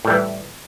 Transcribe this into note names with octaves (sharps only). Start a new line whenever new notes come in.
A2 E3 G3